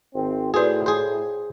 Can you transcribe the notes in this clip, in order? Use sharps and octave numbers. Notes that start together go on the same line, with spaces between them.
G#1 C4
A2 F#4 G#4 B4 C5 D5
G#4 C5